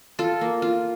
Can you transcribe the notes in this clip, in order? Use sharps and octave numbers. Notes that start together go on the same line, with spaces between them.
F4 A4
A#3
F4